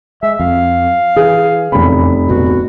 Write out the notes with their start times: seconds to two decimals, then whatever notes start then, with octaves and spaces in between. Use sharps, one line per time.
0.23 G#3 E5
0.39 F2 F5
1.16 E3 G#4
1.72 F1 E2 C#3 B5
2.28 D1 B2 F#4